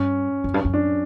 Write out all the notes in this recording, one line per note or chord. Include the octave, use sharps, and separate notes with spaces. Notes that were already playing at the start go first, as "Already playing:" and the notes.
Already playing: G2 C#4
F#2
G2
F#2
D4